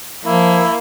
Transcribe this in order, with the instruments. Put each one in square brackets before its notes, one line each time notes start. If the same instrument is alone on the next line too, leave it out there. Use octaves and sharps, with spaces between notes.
[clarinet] F3 [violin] A#3 [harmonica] E4